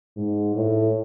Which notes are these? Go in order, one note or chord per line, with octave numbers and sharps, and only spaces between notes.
G#2
A2